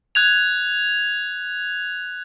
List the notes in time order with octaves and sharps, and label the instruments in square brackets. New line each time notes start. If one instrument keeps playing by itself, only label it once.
[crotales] F#6 G#6 F7